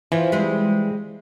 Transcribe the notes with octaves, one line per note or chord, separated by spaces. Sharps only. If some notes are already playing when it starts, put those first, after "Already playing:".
E3 F3
G3 G#3 C4